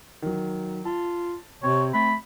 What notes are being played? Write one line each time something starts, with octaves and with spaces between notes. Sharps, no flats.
D#3 F#3
F4 A5
C3 C4 C#5
A3 B5